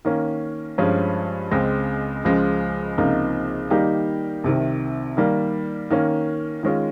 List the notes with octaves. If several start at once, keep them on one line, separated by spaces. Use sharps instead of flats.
D#3 A#3 C#4
G2 F3 G#3 C#4
C#2 C#3 G#3 C4
C#2 C#3 F3 G#3
C#2 C3 F3 A#3 D#4
D#3 G3 A#3 D#4 G4
C2 C3 D#3
D#3 G3 A#3
D#3 A#3 C#4
D#3 G#3 C#4 F4